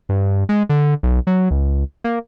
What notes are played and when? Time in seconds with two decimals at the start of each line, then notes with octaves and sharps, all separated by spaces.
0.09 G2
0.49 G#3
0.69 D3
1.03 B1
1.27 F#3
1.51 C#2
2.04 A#3